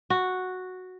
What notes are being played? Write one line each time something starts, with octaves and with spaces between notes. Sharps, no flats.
F#4